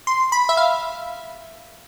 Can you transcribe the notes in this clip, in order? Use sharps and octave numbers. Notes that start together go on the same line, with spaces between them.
C6
B5
E5
F5